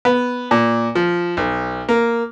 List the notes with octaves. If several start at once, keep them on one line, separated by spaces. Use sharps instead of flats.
B3
A#2
F3
B1
A#3